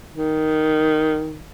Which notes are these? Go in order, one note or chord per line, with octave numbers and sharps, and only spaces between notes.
D#3